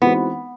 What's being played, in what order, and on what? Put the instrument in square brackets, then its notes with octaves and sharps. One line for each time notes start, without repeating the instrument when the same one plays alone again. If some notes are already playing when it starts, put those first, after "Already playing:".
[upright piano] E3 G#3 C4 D#4 F#4 [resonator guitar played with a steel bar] B3